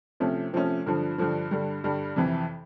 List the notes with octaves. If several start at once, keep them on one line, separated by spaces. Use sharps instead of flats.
C3 F3 A3 C#4
C3 F3 A3 C#4
G2 D3 F3
G2 D3 F3
G2 D3 G3
G2 D3 G3
F2 C3 E3